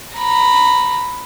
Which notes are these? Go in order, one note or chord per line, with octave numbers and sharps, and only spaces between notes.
A#5 B5